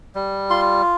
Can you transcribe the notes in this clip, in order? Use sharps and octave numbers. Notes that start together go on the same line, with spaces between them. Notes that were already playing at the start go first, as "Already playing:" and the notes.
G3
F4 C6